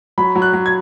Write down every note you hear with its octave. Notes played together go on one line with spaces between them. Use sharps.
F#3 B5
F#3
F#6
F#3
G#6